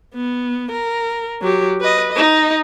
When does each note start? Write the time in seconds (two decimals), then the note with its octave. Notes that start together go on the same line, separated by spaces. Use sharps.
0.15 B3
0.72 A#4
1.41 F#3 G4
1.80 B4 D#5
2.13 D#4 D#5